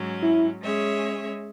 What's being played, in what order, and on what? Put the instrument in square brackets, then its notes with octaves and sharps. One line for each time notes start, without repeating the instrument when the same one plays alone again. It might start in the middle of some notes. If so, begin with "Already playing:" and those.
Already playing: [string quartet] G#2 F#3 C#4
[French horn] E4
[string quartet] G#3 C#4 G#4 C#5 E5